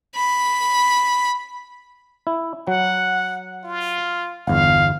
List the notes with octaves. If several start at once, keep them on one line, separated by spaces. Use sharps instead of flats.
B5
E4
F#3 F#5
F4
G1 E2 F5